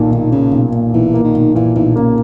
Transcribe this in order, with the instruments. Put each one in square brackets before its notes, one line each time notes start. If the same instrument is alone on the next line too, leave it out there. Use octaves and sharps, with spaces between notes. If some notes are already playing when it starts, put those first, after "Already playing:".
Already playing: [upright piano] B1 A#2 [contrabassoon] D#3
[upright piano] B1
[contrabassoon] C#3 [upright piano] A#3
[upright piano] B1
A#2
[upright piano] B1 [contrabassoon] E3
[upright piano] A#3
[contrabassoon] D#3
[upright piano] B1
[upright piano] A#2 [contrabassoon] E3
[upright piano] B1 [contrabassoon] E3
[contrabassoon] C#3 [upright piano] A#3